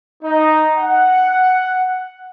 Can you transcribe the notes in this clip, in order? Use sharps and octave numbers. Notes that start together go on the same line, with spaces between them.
D#4
F#5